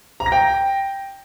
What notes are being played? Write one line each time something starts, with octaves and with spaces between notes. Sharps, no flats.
A#5
A#6
G5